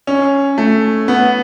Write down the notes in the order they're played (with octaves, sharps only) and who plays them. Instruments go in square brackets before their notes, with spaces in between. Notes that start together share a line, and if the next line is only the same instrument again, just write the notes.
[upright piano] C#4
A3
B3